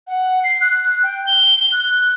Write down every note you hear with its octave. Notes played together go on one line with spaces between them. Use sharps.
F#5
C7
F#6
G5
G7
F#6